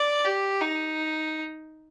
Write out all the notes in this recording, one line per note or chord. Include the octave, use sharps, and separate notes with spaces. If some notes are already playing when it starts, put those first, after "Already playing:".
Already playing: D5
G4
D#4